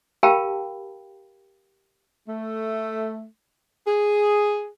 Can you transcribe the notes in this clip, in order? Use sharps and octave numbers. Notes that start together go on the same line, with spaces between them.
G4 A#4 F5 G5 A5 B5
A3
G#4